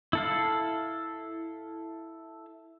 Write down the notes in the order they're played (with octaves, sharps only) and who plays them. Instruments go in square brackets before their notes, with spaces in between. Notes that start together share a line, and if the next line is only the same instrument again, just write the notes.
[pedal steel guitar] E4 A4 F5